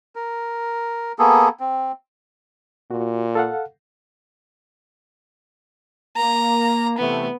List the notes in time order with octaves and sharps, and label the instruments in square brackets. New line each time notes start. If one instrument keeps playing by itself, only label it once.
[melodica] A#4
A#3 B3 G#4 A4
C4
[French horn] A#2 [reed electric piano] F#4
[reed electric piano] A4 F5 F#5
[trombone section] A#3 [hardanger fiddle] A#5
[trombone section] C3 E3 A3 [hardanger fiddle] B3